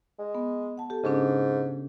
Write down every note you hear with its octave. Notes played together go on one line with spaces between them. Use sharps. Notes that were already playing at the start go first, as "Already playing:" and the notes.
G#3
B3
F#5 A5
G4 A4
G#2 C#3 C#4 D4